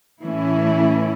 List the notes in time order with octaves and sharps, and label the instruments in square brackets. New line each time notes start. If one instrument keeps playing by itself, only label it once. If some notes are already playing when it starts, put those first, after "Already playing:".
[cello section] A2 E3 A3 C#4 E4